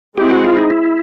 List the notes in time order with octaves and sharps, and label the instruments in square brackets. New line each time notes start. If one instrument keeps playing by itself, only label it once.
[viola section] G#3 C4 E4 G#4 [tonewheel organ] G4
[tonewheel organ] F#4
F4
D#4
E4